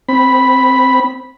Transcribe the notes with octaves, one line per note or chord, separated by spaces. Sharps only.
C4 B5